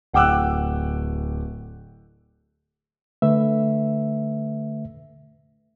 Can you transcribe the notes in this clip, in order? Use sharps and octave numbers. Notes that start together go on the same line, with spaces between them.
D1 F#5 G5 D6 E6 F#6
D3 A3 B4 E5